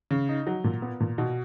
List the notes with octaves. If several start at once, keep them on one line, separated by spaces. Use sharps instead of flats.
C#3
D#4
F#3
A#2
B3
A#2
B2